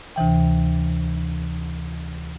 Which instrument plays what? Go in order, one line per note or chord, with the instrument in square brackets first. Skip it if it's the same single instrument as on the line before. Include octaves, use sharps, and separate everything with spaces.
[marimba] D2 C3 E3 G5